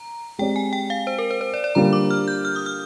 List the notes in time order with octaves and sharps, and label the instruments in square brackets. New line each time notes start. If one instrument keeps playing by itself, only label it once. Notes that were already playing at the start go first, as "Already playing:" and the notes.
Already playing: [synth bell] A#5
[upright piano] G#3 C4 G4 D5 [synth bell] G5
[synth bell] G#5
G5
F5
C5
A#4
C5
C5
D5
D5
[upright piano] D3 G3 A#3 F4 A#4 [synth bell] A#5
[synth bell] D6
F6
G6
F6
D#6
F6